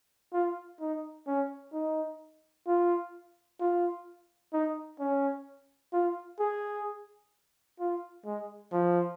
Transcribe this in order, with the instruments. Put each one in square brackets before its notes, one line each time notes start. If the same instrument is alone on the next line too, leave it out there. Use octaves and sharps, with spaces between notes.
[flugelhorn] F4
D#4
C#4
D#4
F4
F4
D#4
C#4
F4
G#4
F4
G#3
F3